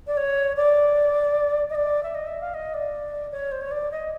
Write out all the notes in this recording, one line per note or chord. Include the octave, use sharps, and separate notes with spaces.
D5
C#5
D5
D#5
D5
E5
D#5
E5
F5
D#5
D5
C#5
C5
C#5
D5
D#5